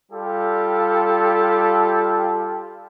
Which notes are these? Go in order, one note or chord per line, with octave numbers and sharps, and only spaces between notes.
G3 F4 G4 A4